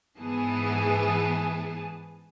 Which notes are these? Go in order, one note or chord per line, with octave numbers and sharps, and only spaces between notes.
G#2 E3 B3 G#4 A5